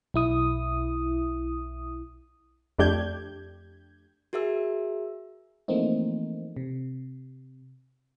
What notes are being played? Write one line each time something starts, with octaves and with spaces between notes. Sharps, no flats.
B1 E4 D#6
F2 A3 D4 G4 G6 G#6
F#4 G#4 A#4 E5 E6
E3 F3 A3 A#3 C4 D#4
C3